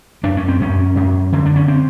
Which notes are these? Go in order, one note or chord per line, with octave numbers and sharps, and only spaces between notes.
F#2 D4
C#4
C4
F#2 C#4
F#2
D3
D4
C#4
C4